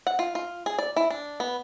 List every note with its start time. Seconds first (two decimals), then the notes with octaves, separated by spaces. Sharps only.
0.07 F#5
0.19 F4
0.35 F4
0.66 G#4
0.79 D5
0.96 E4
1.10 D4
1.40 B3